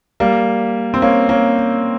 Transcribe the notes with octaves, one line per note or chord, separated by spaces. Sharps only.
G3 A#3
C4
A#3 C#4
A#3 C#4